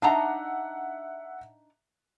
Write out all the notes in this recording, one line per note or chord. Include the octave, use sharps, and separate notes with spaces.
D4 D#4 E5 F#5 A#5